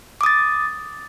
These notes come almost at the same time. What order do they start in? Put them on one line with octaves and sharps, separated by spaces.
D6 D#6 A6